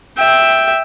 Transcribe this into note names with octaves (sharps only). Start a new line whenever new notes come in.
E5 G5